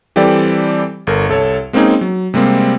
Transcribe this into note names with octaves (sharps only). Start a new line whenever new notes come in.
E3 G3 C4 G4 A4 D5
G1 A4 A#4
C2 A4 C#5
G#3 A#3 C4 C#4 D#4 G#4
F#3
C3 G3 G#3 A#3 C4